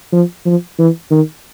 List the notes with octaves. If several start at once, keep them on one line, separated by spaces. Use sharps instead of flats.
F3
F3
E3
D#3